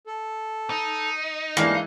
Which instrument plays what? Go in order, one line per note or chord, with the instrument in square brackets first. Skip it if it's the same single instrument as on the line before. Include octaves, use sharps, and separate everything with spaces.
[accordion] A4
[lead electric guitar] D#4
[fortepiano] E3 G#3 E4 [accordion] G3 D4 [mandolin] A#3